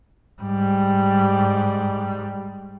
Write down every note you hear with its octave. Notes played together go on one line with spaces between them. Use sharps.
G#2 G3